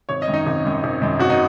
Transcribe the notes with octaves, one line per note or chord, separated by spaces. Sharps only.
G#1 C#5
D#5
F#2 D#3
D#4
G#1
F#2 D#3
G#1
F#2 D#3
G#1 F#4
D#4